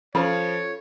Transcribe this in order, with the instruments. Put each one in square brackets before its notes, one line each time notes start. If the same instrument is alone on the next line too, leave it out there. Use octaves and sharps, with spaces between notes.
[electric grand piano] F3 [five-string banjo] C#4 F4 C5 [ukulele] A4 F5 B5 [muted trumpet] C#5